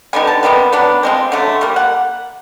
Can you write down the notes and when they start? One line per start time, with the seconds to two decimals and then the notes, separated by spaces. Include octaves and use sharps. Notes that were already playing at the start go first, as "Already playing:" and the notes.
0.13 D3 G3 B3 D#4 G#5
0.27 A5
0.43 C3 D#3 G3 B3
0.73 F#3 B3 D4
1.03 F3 G#3 C4
1.32 D3 F#3 A3
1.61 G3 A#3
1.76 F#5